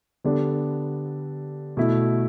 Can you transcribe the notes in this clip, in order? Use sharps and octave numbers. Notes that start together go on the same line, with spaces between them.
D3 G3 B3 D4 A4
B2 A3 E4